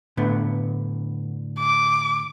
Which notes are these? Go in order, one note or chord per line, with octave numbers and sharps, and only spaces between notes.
A2 D3 B3
D6